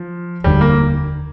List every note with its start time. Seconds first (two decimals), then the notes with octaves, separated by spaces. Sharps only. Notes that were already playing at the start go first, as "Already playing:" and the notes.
Already playing: F3
0.44 F1 D#2 D3 G3
0.61 A#3